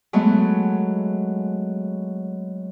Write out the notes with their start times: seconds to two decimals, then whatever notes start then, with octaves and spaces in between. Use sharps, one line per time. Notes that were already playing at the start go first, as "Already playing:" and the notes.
0.13 F#3 G#3 A3 B3